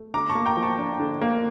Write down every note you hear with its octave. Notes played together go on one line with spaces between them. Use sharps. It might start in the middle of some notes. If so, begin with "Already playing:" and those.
Already playing: A3
D3 A#5 D6
A5 C#6
A#3
G5 A#5
F3
A5 C#6
D4
D3
A#3